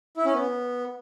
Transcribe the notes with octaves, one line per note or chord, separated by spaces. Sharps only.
E4
C#4
B3